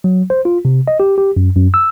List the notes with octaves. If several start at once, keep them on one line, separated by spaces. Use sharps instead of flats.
F#3
C5
F4
C3
D#5
G4
G4
F#2
F#2
E6